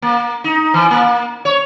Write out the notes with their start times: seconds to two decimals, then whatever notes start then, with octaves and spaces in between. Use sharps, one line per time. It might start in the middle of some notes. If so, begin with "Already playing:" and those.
0.02 A#3
0.44 D#4
0.74 E3
0.91 A#3
1.45 C#5